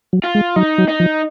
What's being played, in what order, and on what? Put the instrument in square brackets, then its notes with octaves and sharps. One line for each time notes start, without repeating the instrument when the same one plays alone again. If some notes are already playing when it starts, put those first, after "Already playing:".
[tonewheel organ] F#3
[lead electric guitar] F4
[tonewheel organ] G#3
[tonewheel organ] F#3 [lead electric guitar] D#4
[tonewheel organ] F#3
[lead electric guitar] D#4
[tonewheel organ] F3